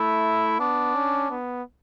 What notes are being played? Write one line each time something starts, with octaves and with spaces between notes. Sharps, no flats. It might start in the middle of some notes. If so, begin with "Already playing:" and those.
Already playing: A3 E4
B3 D4
C#4
B3